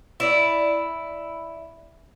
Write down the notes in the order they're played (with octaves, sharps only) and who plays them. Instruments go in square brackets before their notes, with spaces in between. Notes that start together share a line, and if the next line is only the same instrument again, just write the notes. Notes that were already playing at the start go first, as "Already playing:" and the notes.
[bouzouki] E4 D5